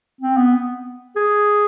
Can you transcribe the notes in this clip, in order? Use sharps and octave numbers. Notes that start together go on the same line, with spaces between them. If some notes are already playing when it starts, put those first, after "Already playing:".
C4
B3
G#4